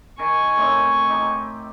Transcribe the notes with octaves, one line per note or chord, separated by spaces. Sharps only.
D#3 G#5 C#6
A2 C4 D#4
D#4 G4